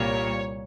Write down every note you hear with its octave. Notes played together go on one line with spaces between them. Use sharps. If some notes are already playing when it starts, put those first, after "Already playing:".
Already playing: C2 A#2 G3 A#3 C#5